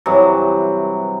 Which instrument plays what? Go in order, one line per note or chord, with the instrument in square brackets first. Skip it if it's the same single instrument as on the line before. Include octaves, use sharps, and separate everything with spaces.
[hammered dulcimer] G2 C3 E3 F#3